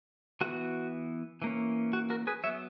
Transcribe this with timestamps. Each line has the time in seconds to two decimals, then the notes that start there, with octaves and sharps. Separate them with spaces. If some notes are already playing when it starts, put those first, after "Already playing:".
0.41 E3 B3 F#4
1.42 E3 A#3 C#4
1.93 F#4
2.10 F#4 A#4
2.27 G#4 B4
2.44 F#3 B3 C#5 E5